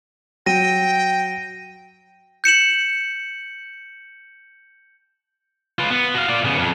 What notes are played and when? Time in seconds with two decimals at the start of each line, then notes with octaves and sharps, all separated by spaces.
0.46 F#3 G5 A#6 D#7
2.44 G6 C#7 E7 F#7
5.79 F4 B4
5.90 B3
6.15 F#4 F5
6.28 F4 D5
6.45 C#3 B3
6.58 F2